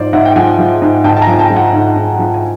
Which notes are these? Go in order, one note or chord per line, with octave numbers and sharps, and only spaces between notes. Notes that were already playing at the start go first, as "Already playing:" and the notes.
Already playing: G#2 F3 C5 D5
G#2 E5 F#5
G5
F3 F#5 G#5
F3
G#2
G#2 G5 A5
A5
G#5 A#5
F3
G#5
G5 A5
F3
F#5 G#5
G#2
G#2
F3
G#5